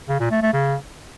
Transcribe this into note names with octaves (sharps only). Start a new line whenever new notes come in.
C#3
A#2
A3
A3
C#3